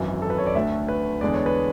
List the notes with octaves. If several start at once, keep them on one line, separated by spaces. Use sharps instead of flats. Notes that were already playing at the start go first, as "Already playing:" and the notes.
Already playing: G#1 F#2 E3
A4
B4
C#5
D5
D2 D3 A3 E5
B4
E2 D3 G#3 B3 D5
C#5
B4